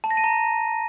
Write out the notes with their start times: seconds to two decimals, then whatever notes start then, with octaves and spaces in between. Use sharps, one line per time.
0.04 A5
0.11 A#6
0.17 D#7
0.24 A#5